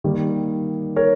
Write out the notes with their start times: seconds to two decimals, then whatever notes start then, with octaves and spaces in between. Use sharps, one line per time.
0.04 D#3 G3 A#3
0.96 A#4 C#5